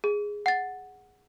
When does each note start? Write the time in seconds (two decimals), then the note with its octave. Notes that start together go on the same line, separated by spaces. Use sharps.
0.04 G#4
0.46 F#5 A6